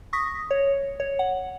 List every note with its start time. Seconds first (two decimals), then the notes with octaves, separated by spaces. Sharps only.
0.13 C#6 D#6 A#6 B6
0.51 C#5
1.00 C#5
1.19 F#5